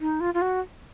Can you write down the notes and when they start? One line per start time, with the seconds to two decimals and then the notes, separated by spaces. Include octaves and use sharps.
0.01 D#4
0.20 F4
0.34 F4
0.42 F#4